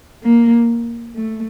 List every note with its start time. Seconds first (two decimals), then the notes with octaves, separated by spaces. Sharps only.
0.23 A#3
1.15 A3